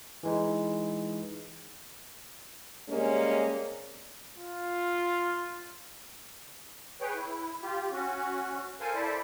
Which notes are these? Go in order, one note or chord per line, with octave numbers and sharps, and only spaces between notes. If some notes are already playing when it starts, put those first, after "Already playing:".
E3 G#3 D#4
C3 G3 G#3 A#3 C#4
F4
G#4 B4 C#5 G5
E4
F4 G4
C#4 F#4
A4 A#4 C5 F5 G#5
E4 A4 C5 D5 E5 A5